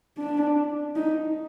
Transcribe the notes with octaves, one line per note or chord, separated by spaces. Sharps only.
D4
D#4